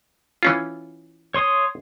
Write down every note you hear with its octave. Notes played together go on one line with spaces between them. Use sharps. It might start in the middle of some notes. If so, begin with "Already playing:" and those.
E3 C#4 F4
C#5 C6 D#6